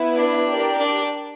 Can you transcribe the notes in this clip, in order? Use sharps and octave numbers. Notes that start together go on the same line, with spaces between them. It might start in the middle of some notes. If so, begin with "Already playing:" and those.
Already playing: B3 E4 B4
D4
G4 A#4 D5
D4